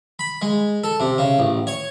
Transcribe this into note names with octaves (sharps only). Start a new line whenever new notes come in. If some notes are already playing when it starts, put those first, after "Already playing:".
B5
G#3
A4
C3
C#3
A1
C#5